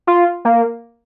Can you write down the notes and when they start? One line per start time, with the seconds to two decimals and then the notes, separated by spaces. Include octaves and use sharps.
0.07 F4
0.45 A#3